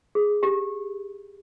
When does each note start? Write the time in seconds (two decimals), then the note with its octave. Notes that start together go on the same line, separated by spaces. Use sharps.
0.15 G#4
0.43 G4